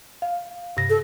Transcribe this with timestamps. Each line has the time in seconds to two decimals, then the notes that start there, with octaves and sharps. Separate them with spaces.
0.22 F5
0.77 G2 C3 A#6
0.90 A4